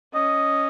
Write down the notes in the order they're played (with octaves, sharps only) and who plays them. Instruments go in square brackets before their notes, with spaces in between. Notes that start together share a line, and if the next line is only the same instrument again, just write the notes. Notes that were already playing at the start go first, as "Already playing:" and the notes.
[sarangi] C#4 [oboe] D#5